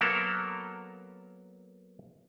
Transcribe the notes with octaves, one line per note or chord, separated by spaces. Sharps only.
F#3 A#3 B3 A4 A#4